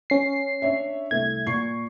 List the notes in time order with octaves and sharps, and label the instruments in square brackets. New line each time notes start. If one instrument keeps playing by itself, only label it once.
[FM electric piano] C#4 C7
[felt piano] D4 C#5 E5
[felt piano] C2 A3 E5 [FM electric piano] G#6
[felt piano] A#2 C#6 C7